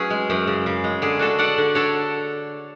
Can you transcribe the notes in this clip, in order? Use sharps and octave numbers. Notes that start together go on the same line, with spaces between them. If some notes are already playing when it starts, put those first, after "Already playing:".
Already playing: F#3 C#4 E4 G#4 B4
G#3
F#2
C#3
C#3
G#3
D3 G#4
D4 F#4 A4
D4 D5 F#5
D3
D4 A4 C#5